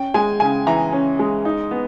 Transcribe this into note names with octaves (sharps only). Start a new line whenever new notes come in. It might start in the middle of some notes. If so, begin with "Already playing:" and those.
Already playing: C#4 G5
G#3 G#5
C#3 G#5
E3 A#5
C#4
G#3
D#4
B3